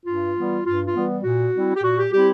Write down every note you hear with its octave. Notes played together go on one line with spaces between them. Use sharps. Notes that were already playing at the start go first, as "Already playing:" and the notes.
G2 F4
E3 G3 B3
G2 F4
F4
E3 G3 B3
A#2 F#4
G3 C4 E4
G4
A#2 F#4
G4
G3 C4 E4 G4